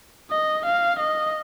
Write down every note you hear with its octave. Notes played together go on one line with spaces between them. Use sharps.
D#5
F5
D#5